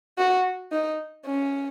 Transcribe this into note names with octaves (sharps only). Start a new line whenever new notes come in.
F#4
D#4
C#4